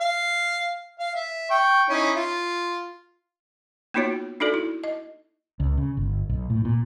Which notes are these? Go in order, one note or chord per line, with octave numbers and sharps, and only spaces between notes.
F5
F5
E5
G5 C#6
C#4 D#4 E4
F4
A#3 B3 D#4 F4 F#4 C#5
D4 D#4 F#4 A4 D5
E4
D#5
C#2
C#3
G1
B1
A2
A#2